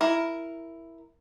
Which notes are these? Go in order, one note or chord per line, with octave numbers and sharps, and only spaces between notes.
E4 A#4